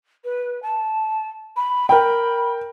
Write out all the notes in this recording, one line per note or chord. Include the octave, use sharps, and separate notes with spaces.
B4
A5
B5
A#4 G5 B5